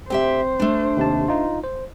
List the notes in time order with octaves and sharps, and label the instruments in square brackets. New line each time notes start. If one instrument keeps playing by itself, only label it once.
[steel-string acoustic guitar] D2 G4 E5 [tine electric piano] C4 [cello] C5
[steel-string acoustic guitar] A3 D4
[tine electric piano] D#2 C3 A5
D#4 F4
C5